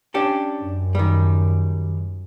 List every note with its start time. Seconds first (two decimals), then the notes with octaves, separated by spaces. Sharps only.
0.14 C#4 D4 G4
0.62 F#2
0.95 D#3 G3